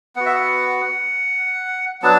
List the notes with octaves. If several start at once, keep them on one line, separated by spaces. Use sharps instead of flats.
B3 F#4 F#5
E5
F#5
F#3 B3 D4 A5